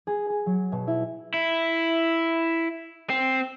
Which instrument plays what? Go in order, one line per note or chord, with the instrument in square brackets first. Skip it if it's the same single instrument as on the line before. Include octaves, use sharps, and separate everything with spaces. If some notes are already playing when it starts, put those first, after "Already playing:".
[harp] G#4
G#4
F#3
B2
E4
[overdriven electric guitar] E4
C4